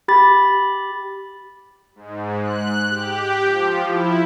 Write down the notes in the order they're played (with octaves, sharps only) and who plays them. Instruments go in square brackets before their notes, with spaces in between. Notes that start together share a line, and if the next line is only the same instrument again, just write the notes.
[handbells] G4 B5 A6
[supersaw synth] G#2
F#6
G4
F3
E4